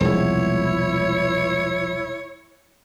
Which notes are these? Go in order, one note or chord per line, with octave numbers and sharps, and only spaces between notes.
E1 C2 F3 G#3 B3 E4 C#5